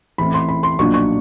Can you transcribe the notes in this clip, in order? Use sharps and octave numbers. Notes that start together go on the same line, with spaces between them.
A1 A2 E3 A3 C4 B5
C6
B5
C6
B1 A#2 F3 A#3 D4 C#6
C#6